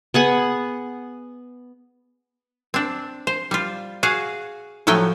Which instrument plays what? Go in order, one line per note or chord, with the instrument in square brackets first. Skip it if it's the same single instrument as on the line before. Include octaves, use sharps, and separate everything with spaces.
[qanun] B3 G#4 F#5
[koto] C4 D4
C5
G3 F4
F#4 G#4 F5
A2 F3 F#3 A3 G5 G#5